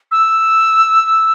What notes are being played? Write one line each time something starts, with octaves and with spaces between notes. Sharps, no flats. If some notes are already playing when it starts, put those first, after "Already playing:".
E6